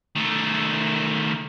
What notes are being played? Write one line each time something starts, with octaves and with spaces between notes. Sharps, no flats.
D#3 A3